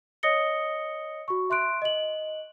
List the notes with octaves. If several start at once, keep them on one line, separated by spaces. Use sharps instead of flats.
C#5 D#5 D#6 A#6 C#7 G7
F#4 C#6
E5 C6 F#6 D7
D#5 F#7